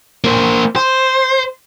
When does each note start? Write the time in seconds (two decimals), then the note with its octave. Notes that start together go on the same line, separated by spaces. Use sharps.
0.24 A#3 C5
0.76 C5